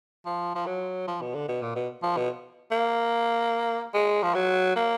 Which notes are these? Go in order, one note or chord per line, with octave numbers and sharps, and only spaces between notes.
F3
F3
F#3
F3
B2
D3
B2
A#2
B2
F3
B2
A#3
G#3
F3
F#3
A#3